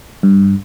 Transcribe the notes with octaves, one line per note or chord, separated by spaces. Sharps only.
G2